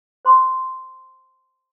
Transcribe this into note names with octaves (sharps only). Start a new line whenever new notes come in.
C5 C6 D6